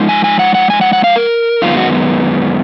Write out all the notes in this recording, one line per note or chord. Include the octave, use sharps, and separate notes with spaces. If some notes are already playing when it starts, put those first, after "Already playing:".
Already playing: F3 G#3 D#4
G#5
G#5
F#5
F#5
G#5
F#5
F#5
F5
A#4
F#2 D#3 G#3 B3 F4
F#4